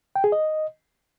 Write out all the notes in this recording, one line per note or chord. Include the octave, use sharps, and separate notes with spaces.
G5
G#4
D#5